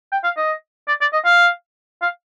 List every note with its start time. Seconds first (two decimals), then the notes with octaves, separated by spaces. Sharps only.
0.12 G5
0.24 F5
0.37 D#5
0.88 D5
1.01 D5
1.13 D#5
1.25 F5
2.02 F5